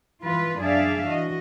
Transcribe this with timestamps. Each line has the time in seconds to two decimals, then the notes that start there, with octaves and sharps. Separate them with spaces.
0.22 E3 F4 B4
0.61 F#2 D4 G#4 D5 E5 F5
1.07 E3 F#4 D#5